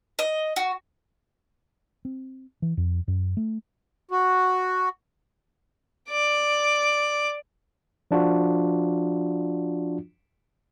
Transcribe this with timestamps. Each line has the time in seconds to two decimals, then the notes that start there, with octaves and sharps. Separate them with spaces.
0.19 D#5
0.56 F#4
2.05 C4
2.62 E3
2.77 F2
3.08 F#2
3.37 A3
4.11 F#4
6.09 D5 D6
8.11 F3 D4 F4 F#4